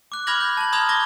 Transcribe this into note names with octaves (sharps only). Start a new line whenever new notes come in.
D6 F#6
B5 D6 F6 G#6 A#6 F#7
G6
A5 F#7
A#5 C6 D#6 F6 G#6 F7
D6 A#6 G7